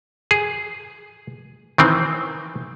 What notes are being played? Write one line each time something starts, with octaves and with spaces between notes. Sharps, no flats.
G#4
D#3 E3 C4